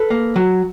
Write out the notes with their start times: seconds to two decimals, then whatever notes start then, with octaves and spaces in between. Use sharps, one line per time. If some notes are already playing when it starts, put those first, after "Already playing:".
Already playing: A4 B4
0.10 A#3
0.36 F#3